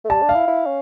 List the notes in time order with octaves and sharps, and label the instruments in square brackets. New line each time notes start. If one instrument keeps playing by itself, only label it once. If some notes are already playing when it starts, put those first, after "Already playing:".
[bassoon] A3
[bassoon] G3 [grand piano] A5
[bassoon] D4
[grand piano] F5
[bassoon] E4
E4
C#4